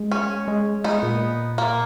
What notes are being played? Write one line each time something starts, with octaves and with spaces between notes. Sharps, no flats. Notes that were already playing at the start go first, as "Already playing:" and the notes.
Already playing: G#3
C#4
G#3
G#3 B3 D#4
A#2
A#3